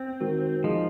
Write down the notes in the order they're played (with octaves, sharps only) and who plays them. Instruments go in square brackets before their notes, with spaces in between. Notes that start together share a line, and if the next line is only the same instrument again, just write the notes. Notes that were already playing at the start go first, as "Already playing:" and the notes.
Already playing: [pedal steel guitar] C4
[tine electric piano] D#3 G#3 D#4 F#4 A#4
[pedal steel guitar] F3 [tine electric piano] G#3 D#4 G#4 D#5